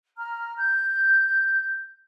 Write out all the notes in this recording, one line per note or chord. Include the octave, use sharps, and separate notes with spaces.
A#5 F6
G6